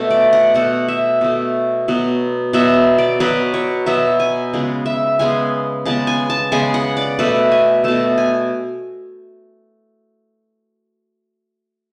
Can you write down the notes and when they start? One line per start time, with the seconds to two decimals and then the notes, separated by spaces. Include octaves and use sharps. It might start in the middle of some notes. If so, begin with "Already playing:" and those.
Already playing: B2 A3
0.11 D5
0.33 F#5
0.54 B2 A3 F#5
0.88 E5
1.21 B2 A3
1.88 B2 F#3 B3
2.53 B2 F#3 B3 E5
2.98 D5
3.20 B2 F#3 B3 B4
3.54 C#5
3.86 B2 F#3 B3 E5
4.20 G#5
4.53 C#3 G#3 B3
4.86 E5
5.19 C#3 G#3 B3 G#5
5.85 C#3 G#3 B3 A5
6.07 G#5
6.30 A5
6.52 C#3 G#3 B3 G#5
6.74 F#5
6.97 D5
7.19 B2 A3 B4
7.52 G#5
7.84 B2 A3 A5
8.18 G#5